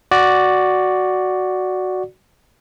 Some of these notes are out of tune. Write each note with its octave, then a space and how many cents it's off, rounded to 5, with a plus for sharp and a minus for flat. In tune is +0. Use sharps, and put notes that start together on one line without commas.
F#4 +0 D5 +0